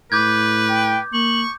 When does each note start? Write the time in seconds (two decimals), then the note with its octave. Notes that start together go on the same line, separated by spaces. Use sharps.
0.12 A2 B4 D6 G6 G#6
0.69 G5
1.13 A#3 C#6 F#7